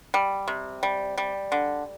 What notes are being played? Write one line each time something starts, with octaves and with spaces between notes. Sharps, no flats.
G3
C3
G3
G3
D3